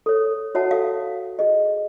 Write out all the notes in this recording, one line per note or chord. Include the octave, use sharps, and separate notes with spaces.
A4 C#5
F#4 C#5 E5 F#5 A5
A4 F5
G#4 D#5